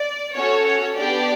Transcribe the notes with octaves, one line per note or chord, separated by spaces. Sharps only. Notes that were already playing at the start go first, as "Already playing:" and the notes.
Already playing: D5
C#4 F#4 A4 C#5
C#5
B3 D4 G4 D5